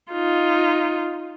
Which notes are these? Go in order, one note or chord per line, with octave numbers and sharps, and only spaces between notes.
D#4 F4